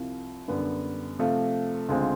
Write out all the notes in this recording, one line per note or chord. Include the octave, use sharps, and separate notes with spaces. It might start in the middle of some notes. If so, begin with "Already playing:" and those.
Already playing: C2 C3 F3
F#2 D3 G3 B3
C3 F3 A3
D2 C#3 F3 G#3 C4